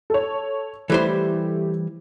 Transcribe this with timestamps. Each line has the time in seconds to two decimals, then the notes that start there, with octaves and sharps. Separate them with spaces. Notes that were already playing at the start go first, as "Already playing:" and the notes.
0.10 A4 C#5
0.90 E3 G3 A3 E4 G4 C5